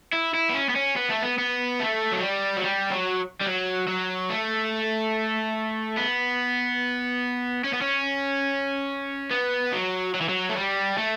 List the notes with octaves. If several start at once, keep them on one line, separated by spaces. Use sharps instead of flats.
E4
E4
B3
C#4
B3
C#4
B3
A3
B3
B3
A3
F#3
G3
F#3
G3
F#3
G3
F#3
F#3
A3
B3
C#4
B3
C#4
B3
F#3
F#3
E3
F#3
A3
G3
A3